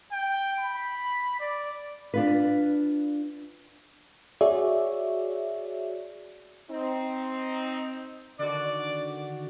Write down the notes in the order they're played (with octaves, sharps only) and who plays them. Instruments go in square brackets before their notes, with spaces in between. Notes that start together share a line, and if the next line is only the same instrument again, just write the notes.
[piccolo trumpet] G5
B5
D5
[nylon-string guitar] D4 F4 B4
[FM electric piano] F#4 G#4 C#5 D5 E5
[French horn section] C4 D#4
[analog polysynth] D3 D#3 F#4 [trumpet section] D5